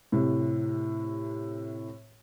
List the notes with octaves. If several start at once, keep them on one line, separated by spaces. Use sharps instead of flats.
A2 C3